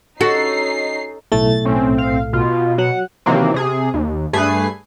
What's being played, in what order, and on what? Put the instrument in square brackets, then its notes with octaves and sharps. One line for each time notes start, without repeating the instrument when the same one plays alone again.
[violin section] C#4 D#4 C7 [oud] F#4 [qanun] A4
[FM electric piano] B1 A2 A3 [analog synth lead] A6
[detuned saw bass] C4 [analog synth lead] C#4
[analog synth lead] F5
[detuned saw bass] B2 [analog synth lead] F4
[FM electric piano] F#3 [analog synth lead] F#5
[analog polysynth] C3 D#3 E3 F#3 A#3 C4
C3 G#4
D#2
G2 A3 G#4 B4 G#5 C7